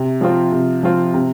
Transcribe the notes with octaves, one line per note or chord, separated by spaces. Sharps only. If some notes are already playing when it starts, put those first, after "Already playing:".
Already playing: C3
F3 C4 F4
C3
F3 C4 F4
C3